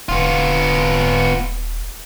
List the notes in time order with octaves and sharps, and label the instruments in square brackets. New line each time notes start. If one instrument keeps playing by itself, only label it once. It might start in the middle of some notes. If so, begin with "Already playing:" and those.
[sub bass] D#1 [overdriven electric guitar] B3 F4